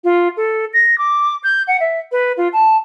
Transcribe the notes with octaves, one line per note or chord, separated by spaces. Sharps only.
F4
A4
A#6
D6
G6
F#5
E5
B4
F4
A5